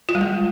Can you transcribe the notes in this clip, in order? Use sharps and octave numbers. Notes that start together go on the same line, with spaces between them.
F4
G3
G#3